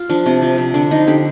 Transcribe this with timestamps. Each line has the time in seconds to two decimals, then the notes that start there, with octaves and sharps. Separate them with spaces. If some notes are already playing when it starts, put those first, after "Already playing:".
Already playing: F4
0.10 F3 D4
0.26 C3 C4
0.42 F3
0.58 C3
0.74 D3 D4
0.91 F3 D#4
1.07 D3 G4